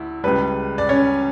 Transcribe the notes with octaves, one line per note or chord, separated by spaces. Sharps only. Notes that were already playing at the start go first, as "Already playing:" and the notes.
Already playing: D2 E4
C#2 C#3 G3 B4
D5
C#4 C#5